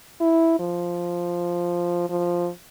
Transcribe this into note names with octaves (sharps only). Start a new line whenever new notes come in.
E4
F3
F3